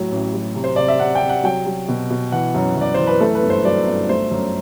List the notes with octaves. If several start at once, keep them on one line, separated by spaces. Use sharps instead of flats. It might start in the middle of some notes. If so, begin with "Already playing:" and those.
Already playing: A2 F#3
A1
F#3
C3
C5
C3 D5
E5
C3 F#5
G5
C3
F#5
F#3 G5
F#3
B2
B2
E3 F#5
F#2
F#2 D5
E3 C5
B4
A3 A4
B4
G1
C5
F#3 D5
G1
A3 C5
F#2